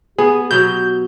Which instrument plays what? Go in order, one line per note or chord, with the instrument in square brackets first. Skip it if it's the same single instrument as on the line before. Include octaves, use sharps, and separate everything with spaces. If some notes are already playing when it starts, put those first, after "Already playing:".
[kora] B3 [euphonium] G4 [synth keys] G#4
[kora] B2 F#3 [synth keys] G6